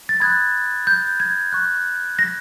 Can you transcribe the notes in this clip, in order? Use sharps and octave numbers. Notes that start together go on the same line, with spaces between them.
A6
B5 D#6 F#6 G#6
G6
G#6
C#6 F#6
A#6